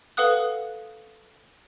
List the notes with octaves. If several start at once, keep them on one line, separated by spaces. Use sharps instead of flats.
A4 B4 F5 F#5 D#6 F#6